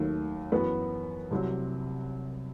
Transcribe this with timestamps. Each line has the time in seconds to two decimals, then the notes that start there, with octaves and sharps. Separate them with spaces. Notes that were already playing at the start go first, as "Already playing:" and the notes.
Already playing: D#2 D#3 F#3 A3
0.52 F#2 E3 B3 F#4 B4
1.31 C2 C3 F#3